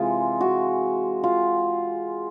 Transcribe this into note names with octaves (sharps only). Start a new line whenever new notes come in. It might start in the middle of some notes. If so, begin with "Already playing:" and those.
Already playing: C3 E3 G#3 F4
F#4
F4